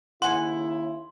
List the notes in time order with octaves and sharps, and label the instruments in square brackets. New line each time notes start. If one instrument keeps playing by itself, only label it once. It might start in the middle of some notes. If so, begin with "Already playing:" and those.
[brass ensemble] D#2 C#3 E4 [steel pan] F#5 G#5 [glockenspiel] C6